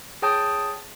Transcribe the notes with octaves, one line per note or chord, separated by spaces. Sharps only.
G#4 C#5 G5 A5 D#6 G6